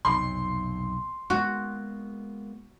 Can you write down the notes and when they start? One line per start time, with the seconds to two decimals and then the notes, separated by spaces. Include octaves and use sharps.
0.05 B1 F2 C3 C6
1.30 G#3 A#3 B3 F#4